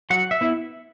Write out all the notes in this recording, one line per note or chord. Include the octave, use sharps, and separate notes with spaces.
F#3 F#5
E5
B3 E4